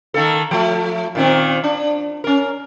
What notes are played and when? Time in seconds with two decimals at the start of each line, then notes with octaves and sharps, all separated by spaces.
0.14 D#3 A#3 A4
0.51 F3 A3
1.15 A#2 D#3 C4
1.64 D4
2.24 C#4 A#4